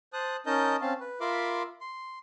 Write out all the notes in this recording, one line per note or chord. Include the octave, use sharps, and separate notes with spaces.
C5 A5 D#6 F#6
C#4 D#4 A#4 D#5 A5 G6
C4 C#4 F5 A5
B4
F4 A#4 E5 B5 C6 D6
C6